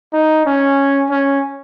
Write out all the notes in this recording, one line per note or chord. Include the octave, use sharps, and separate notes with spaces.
D#4
C#4
C#4